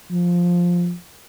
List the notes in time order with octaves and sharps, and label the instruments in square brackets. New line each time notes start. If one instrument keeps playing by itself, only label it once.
[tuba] F3